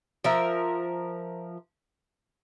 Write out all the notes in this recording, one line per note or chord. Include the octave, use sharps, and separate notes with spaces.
F3 A#4 E5